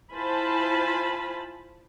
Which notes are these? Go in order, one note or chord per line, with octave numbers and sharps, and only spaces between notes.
E4 F4 C5 G#5 A5 B5